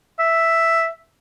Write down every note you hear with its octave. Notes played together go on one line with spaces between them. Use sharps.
E5